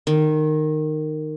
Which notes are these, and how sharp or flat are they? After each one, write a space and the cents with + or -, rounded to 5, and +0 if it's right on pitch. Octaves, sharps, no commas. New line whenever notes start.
D#3 -15